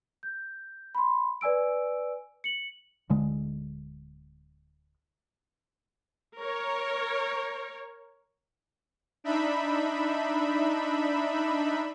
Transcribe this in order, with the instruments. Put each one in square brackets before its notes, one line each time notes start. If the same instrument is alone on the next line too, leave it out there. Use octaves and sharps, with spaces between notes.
[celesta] G6
B5 C6
B4 D5 G#5 E6 D7
C#7 F#7
[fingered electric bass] D1 D3 G#3
[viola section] A#4 C#5
[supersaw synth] D4 D#4 E5 B5